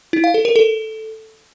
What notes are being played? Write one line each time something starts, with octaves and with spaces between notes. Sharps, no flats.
E4
F5
A4
A#4
A4